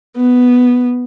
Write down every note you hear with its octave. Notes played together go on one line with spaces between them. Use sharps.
B3